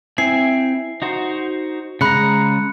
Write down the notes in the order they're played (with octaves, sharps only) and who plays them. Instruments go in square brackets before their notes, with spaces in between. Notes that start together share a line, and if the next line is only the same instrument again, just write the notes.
[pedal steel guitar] C4 E4 G#5 [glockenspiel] C7
[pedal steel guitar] D#4 F#4 C5
[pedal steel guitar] C#3 G#3 A#5 [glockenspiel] B5 F#6 C#7